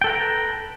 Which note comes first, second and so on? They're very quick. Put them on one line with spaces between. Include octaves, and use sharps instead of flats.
G5 A4 B4 A#5